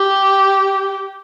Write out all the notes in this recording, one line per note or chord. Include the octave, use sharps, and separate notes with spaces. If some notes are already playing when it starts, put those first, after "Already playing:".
Already playing: G4